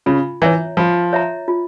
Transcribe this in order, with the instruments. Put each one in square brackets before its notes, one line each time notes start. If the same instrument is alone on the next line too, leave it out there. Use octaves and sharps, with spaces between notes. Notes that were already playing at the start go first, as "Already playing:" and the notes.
[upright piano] C#3 [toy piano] F4
[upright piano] E3 [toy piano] C#5 E5 A#5
[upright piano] F3 [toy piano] F4
[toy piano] C#5 E5 A#5
F4